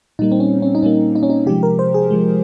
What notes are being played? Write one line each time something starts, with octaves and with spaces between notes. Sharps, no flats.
A#2 G3 A#3 D#4
C4
C#4
C#4
D#4
A#2 G3 A#3 C#4
D#4
C#4
D#4
C3 F3 G#3 G4
A#4
C5
G#4
C3 F3 G#3